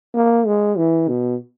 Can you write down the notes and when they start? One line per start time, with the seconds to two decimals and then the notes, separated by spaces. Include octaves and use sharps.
0.15 A#3
0.46 G#3
0.78 E3
1.08 B2